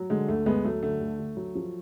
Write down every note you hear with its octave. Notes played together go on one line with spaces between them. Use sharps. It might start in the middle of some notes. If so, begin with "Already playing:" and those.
Already playing: F#3
D3 G#3
D2 A3
D2 G#3 B3
F#3 A3
D3 A3
D2
D2
F#3
F3